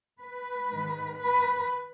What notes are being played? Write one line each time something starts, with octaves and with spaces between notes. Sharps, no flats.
B4
G#2 D#3
B4